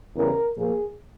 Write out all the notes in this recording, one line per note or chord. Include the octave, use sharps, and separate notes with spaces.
E2 C#3 E3 G3 A#4
A#2 F3 A#3 G#4